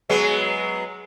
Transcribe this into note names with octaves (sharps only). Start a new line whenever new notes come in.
F#3 G#3 B3